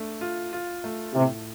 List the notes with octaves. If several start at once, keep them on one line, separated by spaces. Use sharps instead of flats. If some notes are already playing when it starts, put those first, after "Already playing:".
Already playing: A3 D4
F4
F4
A3
A2 C3